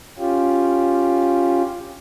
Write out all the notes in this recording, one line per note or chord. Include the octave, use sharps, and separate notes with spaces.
C#4 F4 G4